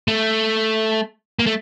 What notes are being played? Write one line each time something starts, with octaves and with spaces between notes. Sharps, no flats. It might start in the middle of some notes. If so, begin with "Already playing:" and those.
A3
A#3
A3